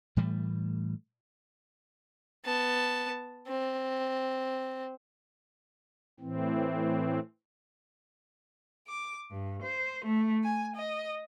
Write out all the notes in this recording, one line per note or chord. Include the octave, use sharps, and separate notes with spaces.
A2 E3 G3 A3
B3 A5
C4
A2 E3 C4
D6
G2
C5
A3
G#5
D#5